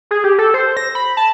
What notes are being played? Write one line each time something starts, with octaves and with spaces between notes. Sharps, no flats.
G#4
G4
A4
C5
A#6
B5
A5